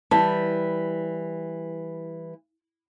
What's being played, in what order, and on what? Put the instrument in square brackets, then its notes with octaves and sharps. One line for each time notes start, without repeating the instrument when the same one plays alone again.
[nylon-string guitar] E3 G3 [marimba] A5